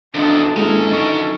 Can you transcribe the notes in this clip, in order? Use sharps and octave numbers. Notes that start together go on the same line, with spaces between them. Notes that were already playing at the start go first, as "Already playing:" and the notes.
E2 D3 D#3 F3 D4 A5
G#3 A#3 C#4 E4 G#4 A4 A#5
F#3 D#4 A#4 C#6